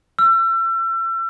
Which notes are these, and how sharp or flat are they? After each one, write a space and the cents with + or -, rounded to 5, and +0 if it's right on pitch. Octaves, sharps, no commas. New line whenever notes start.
E6 +35